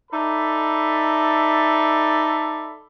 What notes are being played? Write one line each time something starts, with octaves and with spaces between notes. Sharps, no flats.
D#4 A4 D5 E5 B5